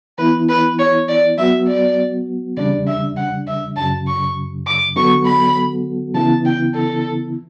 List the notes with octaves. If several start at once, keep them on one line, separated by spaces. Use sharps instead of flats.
E3 B3 E4 B4
B4
C#5
D5
F#3 B3 F#4 E5
D5
E2 C#3 G3 D4 D5
E5
F#5
E5
F#2 C#3 F#3 A5
C#6
D6
D3 F#3 B3 F#4 A4 C#6
B5
C#3 E3 B3 E4 A5
G5
A4